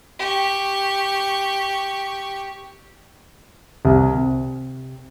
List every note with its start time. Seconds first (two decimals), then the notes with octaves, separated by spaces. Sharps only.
0.19 G4 C#6
3.85 C2
4.14 C3